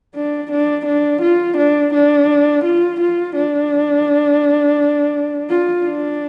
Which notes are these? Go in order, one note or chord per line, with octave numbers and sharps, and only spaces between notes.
D4
D4
D4
F4
D4
D4
F4
F4
D4
F4
D4